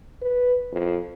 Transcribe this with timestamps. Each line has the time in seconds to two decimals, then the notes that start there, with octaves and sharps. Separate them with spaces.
0.22 B4
0.72 F2